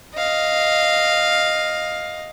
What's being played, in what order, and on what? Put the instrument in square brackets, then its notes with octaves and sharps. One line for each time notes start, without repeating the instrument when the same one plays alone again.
[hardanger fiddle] D#5 F5